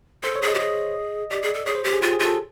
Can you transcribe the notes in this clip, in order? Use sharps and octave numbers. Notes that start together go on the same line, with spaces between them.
A4 C5
C#5
G#4
D#5
G4
G#4 D#5
G4 D5
G#4
A4
G#4 C#5
C5
G4
G#4
F4 G4
G#4
F4
A4